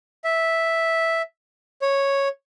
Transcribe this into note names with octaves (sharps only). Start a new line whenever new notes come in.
E5
C#5